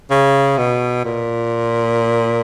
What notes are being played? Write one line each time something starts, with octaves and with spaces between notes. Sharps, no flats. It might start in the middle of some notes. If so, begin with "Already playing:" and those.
C#3
B2
A#2